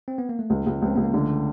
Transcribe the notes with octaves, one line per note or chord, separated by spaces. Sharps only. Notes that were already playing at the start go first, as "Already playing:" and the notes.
C4
B3
A#3
A3
C#2 G#3
C#2
C#2 C4
C#2 B3
A#3
D3 A3